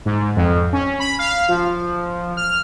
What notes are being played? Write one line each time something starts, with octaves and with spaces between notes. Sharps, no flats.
G#2
F2
C#4
B5
F5
F3
F6